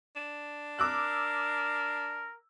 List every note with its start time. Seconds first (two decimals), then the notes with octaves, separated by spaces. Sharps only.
0.16 D4
0.79 A#4 D6 E6 F#6